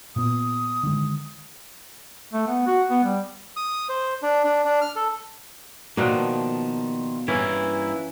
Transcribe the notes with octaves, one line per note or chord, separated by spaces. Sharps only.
A#2 B3 D#6
D3 D#3 G#3
A3
B3
F#4
B3
G3
D#6
C5
D4
D4
D4
F6
A4
B2 D#3 F3 A#3 D4
G2 E3 A#3 C#4 E4